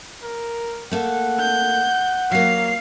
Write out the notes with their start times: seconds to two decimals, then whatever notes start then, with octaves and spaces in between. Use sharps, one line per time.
0.23 A#4
0.91 A3 A#3 A4 F#5
1.40 G6
2.31 F#3 A#3 F5 C7